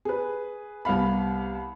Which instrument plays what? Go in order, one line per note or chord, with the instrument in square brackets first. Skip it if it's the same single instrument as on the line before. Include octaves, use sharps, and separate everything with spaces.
[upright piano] G#4 B4
C2 B3 F5 B5